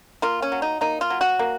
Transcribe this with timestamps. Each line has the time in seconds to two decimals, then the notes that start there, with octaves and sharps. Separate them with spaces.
0.22 A#3 F4
0.42 C#4
0.52 F#3
0.62 D#4
0.81 A#3 D#4
1.01 F4
1.10 F#3
1.21 F#4
1.39 A#3